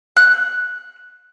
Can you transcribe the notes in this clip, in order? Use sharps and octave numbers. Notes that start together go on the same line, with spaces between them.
F#6